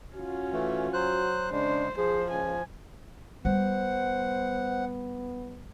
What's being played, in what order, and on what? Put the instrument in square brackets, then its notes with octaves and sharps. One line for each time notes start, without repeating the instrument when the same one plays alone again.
[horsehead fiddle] C#4 F4 [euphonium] F#4
[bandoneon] E3 A3
F#3 C5 F#6
[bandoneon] C#3 G#3 [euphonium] D4 [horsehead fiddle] C5
[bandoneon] F3 [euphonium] G#4 [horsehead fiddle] C5
[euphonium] C#2 [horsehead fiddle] G#5
[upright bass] G3 [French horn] B3 [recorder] C5 [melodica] F#5